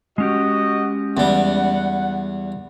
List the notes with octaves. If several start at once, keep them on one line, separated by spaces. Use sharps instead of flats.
G#3 C#4 F#4 G4 D#5
E2 G3 F#5